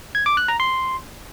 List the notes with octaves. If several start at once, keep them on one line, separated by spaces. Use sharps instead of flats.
G#6
D6
F#6
A#5
C6